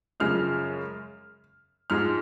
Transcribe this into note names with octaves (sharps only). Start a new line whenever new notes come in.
F#2 C#3 F3 G#3 F6
G#2 F3 G#3 F6